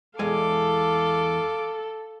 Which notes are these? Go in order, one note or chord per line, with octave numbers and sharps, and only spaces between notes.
E2 G#3 A4 F5 G#5 D6